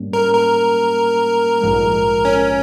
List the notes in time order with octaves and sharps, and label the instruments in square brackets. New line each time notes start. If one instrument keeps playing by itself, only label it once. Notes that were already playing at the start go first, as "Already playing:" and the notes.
Already playing: [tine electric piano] G#2 G3 A#3 C#4
[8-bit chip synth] A#4
A#4
[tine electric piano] A#1 G#2 F3 G#3
[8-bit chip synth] C#4